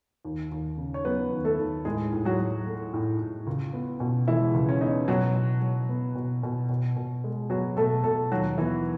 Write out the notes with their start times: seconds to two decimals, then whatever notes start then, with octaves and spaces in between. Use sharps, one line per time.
0.25 D#2
0.52 D#2
0.77 C#3
0.94 C#5
1.05 F#3 B3 B4
1.32 D#2
1.45 A3 A4
1.59 D#2
1.85 A2 G#3 G#4
2.13 A2
2.25 F#3 F#4
2.40 F#3
2.67 A3
2.94 A2
3.19 A2
3.47 C#2
3.73 B3
4.00 B2
4.27 E3 G#3 E4
4.54 C#2
4.69 C#4
4.81 B3 D#4
5.08 B2 F#3 F#4
5.35 B2
5.62 F#3
5.89 B3
6.16 B2
6.43 B2
6.69 B2
6.97 B2
7.24 G#3
7.50 F#3 B3 F#4
7.77 B2 A3 A4
8.04 B2 A3 A4
8.32 D#2 F#3 F#4
8.57 E3 B3 E4